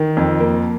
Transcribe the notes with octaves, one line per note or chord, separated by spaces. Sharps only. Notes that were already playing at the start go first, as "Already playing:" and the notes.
Already playing: D#3
F2
A#3